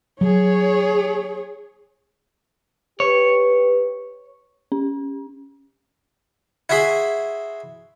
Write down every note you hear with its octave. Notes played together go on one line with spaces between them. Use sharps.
F#3 G#4 C#5
G4 B4 C#5
C#4
E4 F#4 G#4 E5 C6